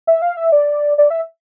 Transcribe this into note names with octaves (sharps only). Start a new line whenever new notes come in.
E5
F5
E5
D5
D5
E5